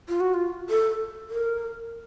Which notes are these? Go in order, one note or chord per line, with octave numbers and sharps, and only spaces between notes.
F4
F#4
F4
A4
A#4